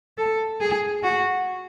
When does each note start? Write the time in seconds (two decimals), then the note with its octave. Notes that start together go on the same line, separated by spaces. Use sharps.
0.18 A4
0.61 G#4
1.03 F#4